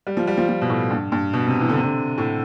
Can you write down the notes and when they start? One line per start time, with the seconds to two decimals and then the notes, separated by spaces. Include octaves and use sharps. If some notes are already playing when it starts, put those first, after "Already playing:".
0.07 G3
0.17 F3
0.27 G3
0.37 F3
0.48 F3
0.62 B2
0.69 A2
0.91 G2
1.12 G2
1.33 B2
1.47 C3
1.61 E3
1.69 D3
1.77 C3
1.84 D3
2.18 A2